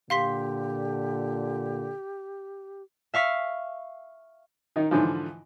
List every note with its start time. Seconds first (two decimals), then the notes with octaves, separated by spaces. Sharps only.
0.10 A#2 D3 G4 F5 C6 B6
3.14 E5 F5 C#6 B6
4.76 D#3 D#4
4.91 G#2 D3 E3 F3